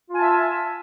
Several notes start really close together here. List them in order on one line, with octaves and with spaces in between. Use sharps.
F4 G#5 A5 E5